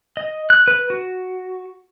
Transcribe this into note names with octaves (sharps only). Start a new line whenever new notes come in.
D#5
F#6
B4
F#4